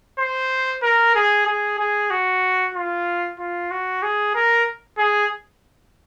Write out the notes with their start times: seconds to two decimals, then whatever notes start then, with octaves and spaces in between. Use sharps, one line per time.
0.19 C5
0.83 A#4
1.15 G#4
1.46 G#4
1.79 G#4
2.11 F#4
2.74 F4
3.39 F4
3.71 F#4
4.02 G#4
4.35 A#4
4.98 G#4